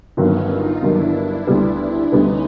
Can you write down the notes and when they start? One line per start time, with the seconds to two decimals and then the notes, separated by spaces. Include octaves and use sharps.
0.17 G1 G2 D#3 F#3 B3 C#4
0.49 D#4 F4
0.81 G1 G2 D#3 F#3 D4 E4
1.47 D2 D3 G3 B3
2.12 D2 D3 G3 B3 C#4 D#4